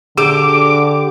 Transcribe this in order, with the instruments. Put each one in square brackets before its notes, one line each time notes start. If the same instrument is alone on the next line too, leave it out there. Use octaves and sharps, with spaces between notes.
[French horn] D3 [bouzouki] G4 [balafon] G#4 [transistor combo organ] D6